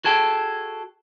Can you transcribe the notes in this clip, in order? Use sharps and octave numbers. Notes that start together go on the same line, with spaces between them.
F#4 G#4 A4 G5